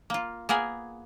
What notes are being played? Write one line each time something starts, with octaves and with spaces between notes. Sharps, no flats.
A#3 F4
A#3 B3 G#4 A#4 G#5